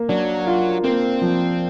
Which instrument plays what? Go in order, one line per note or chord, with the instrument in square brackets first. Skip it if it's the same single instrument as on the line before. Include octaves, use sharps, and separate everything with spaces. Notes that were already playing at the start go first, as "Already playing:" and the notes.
Already playing: [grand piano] A#3
[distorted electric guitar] F#3 [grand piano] D4
[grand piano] F4
[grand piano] A#3 [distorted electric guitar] C4
[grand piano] F3